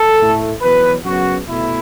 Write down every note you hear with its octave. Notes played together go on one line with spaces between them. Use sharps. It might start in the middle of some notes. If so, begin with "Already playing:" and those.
Already playing: A4
A2 A3
E2 B2 F#3 B4
F#2 C#3 F#3 B3 F#4
B2 A3 E4